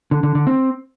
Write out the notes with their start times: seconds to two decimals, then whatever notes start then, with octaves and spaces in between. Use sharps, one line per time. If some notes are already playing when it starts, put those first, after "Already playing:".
0.11 D3
0.23 D3
0.35 D3
0.47 C4